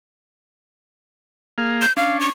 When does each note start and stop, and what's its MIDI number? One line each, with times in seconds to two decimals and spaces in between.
1.58 1.86 58
1.58 1.86 68
1.58 1.86 77
1.82 1.93 91
1.97 2.30 61
1.97 2.30 62
1.97 2.20 77
2.20 2.28 85